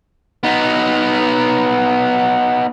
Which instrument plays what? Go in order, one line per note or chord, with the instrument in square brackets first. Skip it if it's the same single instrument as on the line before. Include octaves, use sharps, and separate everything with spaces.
[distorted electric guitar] B3 D#4